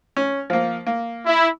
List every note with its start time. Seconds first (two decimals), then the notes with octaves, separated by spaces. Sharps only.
0.17 C#4
0.50 F3 A#3
0.87 A#3
1.25 E4